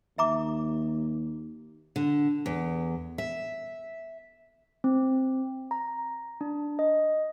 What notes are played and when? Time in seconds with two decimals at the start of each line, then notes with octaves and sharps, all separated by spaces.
0.18 D#2 E5 A#5 D6
1.96 D3
2.46 E2
3.18 E5
4.84 C4
5.71 A#5
6.41 D4
6.79 D#5